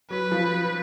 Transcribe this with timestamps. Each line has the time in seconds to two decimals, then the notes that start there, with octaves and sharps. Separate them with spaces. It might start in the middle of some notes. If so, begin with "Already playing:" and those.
0.10 F#3 B4
0.32 F3